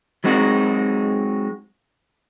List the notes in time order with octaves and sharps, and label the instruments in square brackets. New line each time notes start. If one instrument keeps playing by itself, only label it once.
[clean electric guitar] F#3 G#3 C4 D#4 F#4